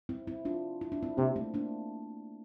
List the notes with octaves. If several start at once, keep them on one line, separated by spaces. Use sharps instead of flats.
C4 E4
C4 E4
D4 F4
E4
D4
C4 E4
C3 A#3 D4
A3 C4
A#3 D4